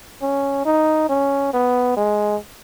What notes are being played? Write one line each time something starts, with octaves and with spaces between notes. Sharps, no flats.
C#4
D#4
C#4
B3
G#3